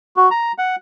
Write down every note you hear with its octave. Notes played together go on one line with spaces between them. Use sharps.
F#4
A#5
F#5